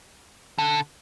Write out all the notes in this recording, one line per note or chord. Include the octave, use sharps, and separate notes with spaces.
D3